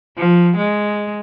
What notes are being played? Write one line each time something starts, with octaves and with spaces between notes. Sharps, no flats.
F3
G#3